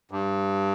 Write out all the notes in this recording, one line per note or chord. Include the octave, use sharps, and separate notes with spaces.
G2